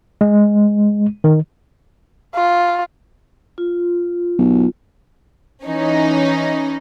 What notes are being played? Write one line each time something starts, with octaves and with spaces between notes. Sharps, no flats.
G#3
D#3
F4
F4
B1
E3 C#4 D#4